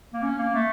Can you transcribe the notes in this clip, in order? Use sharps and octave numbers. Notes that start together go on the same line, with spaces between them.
A#3
C#4
A#3
A3